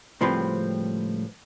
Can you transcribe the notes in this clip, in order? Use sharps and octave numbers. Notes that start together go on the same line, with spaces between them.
C#2 A2 F3 G3 C4 B4